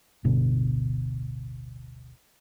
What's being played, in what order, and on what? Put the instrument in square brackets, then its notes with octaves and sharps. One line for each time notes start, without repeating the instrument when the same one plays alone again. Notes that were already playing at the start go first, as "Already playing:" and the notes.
[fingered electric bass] D1 G1 B2 D3